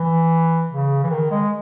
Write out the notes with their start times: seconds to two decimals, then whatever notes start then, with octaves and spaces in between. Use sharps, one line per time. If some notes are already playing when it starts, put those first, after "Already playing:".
Already playing: E3
0.70 C#3
1.03 E3
1.10 D#3
1.31 G#3